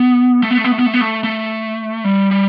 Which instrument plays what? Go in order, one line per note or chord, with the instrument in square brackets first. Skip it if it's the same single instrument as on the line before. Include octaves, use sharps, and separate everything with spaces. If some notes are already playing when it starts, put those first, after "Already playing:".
Already playing: [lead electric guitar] B3
A3
B3
A3
B3
A3
B3
A3
B3
A3
A3
G3
G3